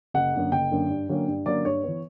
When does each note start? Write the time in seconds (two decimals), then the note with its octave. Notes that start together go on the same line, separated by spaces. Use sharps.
0.14 F#1 F#5
0.33 F#2 D3 A#3
0.52 F#1 G5
0.70 F#2 D3 A#3
0.90 G2
1.09 D3 F#3 A#3 C#4
1.28 G2
1.46 D3 F#3 A#3 C#4 D5
1.65 G2 C#5
1.83 E3 B3